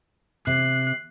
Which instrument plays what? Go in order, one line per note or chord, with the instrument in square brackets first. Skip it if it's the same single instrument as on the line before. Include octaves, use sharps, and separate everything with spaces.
[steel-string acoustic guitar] C3 [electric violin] F#6 C7